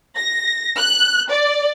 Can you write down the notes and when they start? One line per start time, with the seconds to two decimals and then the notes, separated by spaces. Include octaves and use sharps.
0.16 A#6
0.77 F#6
1.31 D5